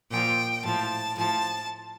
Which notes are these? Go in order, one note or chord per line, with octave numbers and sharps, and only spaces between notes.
A#2 F3 G5
A2 F3 A5
A2 F3 A5